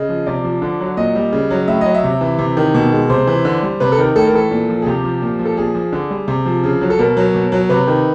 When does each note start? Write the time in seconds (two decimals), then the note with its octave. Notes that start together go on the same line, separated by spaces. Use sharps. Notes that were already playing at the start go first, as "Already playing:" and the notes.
Already playing: C#3 D#5
0.09 F3
0.26 C3 D5
0.44 F3
0.62 D3
0.80 F#3
0.97 A#2 D#5
1.15 G3
1.32 C#3
1.50 F#3
1.68 A2 E5
1.81 F#3 D#5
1.94 E5
2.04 C3
2.21 E3
2.39 C3
2.57 D#3
2.75 B2
2.92 G#3
3.09 C3 C5
3.27 E3
3.45 D3
3.63 G3
3.80 C3 B4
3.92 A4
3.98 D#3 A#4
4.16 A2 A4
4.25 A#4
4.33 E3 A4
4.51 A#2
4.69 F3
4.82 G#4
4.86 C3 G4
5.04 F3
5.22 A#2
5.39 F3
5.45 A4
5.57 A#2 G#4
5.75 F3
5.93 D3
6.11 G3
6.28 C3
6.46 F3
6.64 C#3
6.81 F#3
6.90 A4
6.99 B2 A#4
7.17 F#3
7.34 B2
7.52 F#3
7.69 C3 B4
7.87 D#3